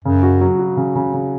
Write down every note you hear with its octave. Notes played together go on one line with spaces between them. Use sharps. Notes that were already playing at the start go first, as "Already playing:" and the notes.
F#2 C#3
F#4
F#3
F#4
C#3
C#3
C#3